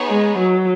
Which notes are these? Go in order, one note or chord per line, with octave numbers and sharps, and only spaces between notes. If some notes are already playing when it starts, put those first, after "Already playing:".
Already playing: B3 D#4 G#4 C#5
G#3
F#3